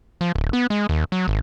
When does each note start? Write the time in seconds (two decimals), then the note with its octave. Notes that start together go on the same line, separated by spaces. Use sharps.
0.21 F3
0.35 D1
0.53 B3
0.70 G#3
0.89 D#2
1.12 F#3
1.28 G#1